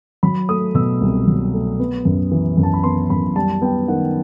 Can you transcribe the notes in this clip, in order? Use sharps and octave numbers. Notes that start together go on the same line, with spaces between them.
F#3 B5
A3 D#6
B2 E6
C2
F#3
A3
B3
F#2
E3
F#2
A5
B5
B3 C6
F#2 B5
G3 A5
B3 G5
D#3 F#5